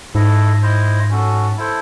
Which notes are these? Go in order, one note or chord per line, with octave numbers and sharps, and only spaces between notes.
G#2 E4 A4 D#5
E4 C5 D#5
C#4 F#4 A4
E4 A4 C5